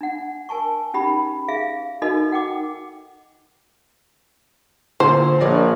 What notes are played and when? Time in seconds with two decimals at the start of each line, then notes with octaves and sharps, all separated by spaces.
0.01 D4 F#5
0.49 A#4 G#5 A5 C#6
0.94 C#4 D#4 G4 B5
1.48 G#4 E5 F5
2.02 D#4 F#4 A4 A#4 D#5
2.31 A4 F#5 G5 D6
5.00 A#2 D3 C5
5.40 A#1 C#5 D5 A#6